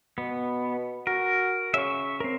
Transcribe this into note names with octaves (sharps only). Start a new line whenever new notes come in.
B2 B3
F#4 A#4
C#3 E5 C#6
C4 A#4